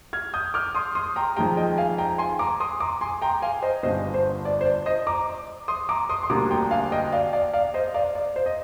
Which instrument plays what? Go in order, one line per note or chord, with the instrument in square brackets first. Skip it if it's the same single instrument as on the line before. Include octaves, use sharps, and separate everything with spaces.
[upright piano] F6 G#6
D#6 G6
D6 F6
C6 D#6
C6 D#6
G5 A#5
F2 D#3 G#3 G5 A#5
D#5 G5
F5 G#5
G5 A#5
G#5 C6
A#5 D6
C6 D#6
A#5 D6
G#5 C6
G5 A#5
F5 G#5
C5 D#5
G1 G2 D3 C5 D#5
C5
D5
C5
D5
C5 D#5
A#5 D6
C6 D#6
A#5 D6
C6 D#6
C6
D2 D3 G3 A#3 A#5 D6
G5 A#5
F5 G#5
D#5 G5
D5 F5
D5 F5
D5 F5
C5 D#5
D5 F5
D5
C5
D#5